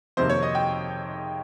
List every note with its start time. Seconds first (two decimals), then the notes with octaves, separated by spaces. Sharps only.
0.17 F2 C3 D#3 A#3 C5
0.29 C#5
0.42 D#5
0.55 G5